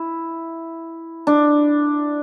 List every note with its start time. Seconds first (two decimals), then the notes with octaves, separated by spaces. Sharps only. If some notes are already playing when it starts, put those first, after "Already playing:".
Already playing: E4
1.27 D4